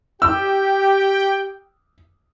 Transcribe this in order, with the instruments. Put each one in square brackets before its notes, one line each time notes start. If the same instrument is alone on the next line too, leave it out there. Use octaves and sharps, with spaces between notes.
[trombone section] G4 [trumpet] G5 [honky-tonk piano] E6